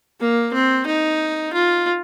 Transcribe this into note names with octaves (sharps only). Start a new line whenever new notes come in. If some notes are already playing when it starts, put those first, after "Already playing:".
A#3
C4
D#4
F4